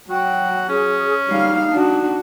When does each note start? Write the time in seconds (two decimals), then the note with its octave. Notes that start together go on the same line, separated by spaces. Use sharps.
0.10 F#3 F#4 G5
0.69 C#4 G#4
1.28 G3 D#4 F5
1.73 D4 F#4